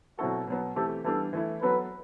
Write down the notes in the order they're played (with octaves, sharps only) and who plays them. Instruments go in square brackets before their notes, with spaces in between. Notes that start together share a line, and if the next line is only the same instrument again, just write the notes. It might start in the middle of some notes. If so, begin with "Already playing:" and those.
[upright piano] B2 F#3 C4 E4 A4 [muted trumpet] F#4
[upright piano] B2 F#3 B3
[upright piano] E3 A3 C4 G4 [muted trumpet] A4
[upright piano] E3 G3 B3 D4 [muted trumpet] A4
[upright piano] E3 A3 E4
[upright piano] F#3 B3 F#4 A4 [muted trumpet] B4